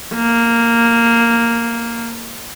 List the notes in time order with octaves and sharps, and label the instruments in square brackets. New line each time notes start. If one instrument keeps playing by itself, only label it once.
[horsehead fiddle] A#3